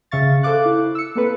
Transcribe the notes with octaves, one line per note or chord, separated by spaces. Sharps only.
C#3 E5 F5 C#6 A6
A4 C5 F5 D6 F#6
E4
E6 C#7
A#3 C4 A4 B4